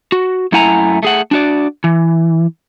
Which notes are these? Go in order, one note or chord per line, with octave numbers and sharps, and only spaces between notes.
F#4
F#2 A3 E4 F#5 G#5 A#5
A3 G#4 F#5
D4 F#4 D5
E3